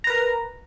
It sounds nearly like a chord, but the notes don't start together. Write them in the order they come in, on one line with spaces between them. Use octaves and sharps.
A#5 B4 A#4